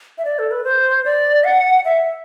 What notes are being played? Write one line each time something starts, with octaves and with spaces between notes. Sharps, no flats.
E5
D5
A4
B4
C5
D5
F#5
E5